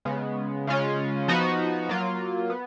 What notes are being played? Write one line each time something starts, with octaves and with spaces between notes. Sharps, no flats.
C#3 G#3 B3
C#3 G#3 C#4 F4
F3 B3 D#4 F#4
F#3 A#3 F4
B3